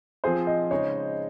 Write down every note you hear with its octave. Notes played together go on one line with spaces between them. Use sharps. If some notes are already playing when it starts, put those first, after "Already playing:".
F3 C4 F4 G#4 C5
D#5
C#3 G#3 D#4 C#5